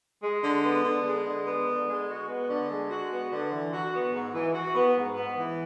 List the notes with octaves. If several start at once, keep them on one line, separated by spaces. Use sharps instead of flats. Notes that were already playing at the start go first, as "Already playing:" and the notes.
G#3
D3
B3
D3
G#3
D3
B3
D3
G#3
F#4
B3
D3
G#3
F#4
B3
D3
E3
F#4
B3
G#2
E3
F#4
B3
G#2
B3
E3